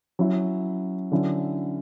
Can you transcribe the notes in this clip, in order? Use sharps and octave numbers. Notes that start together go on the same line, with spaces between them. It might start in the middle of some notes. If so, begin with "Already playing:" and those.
F#3 C#4 E4
D3 F#3 C#4 E4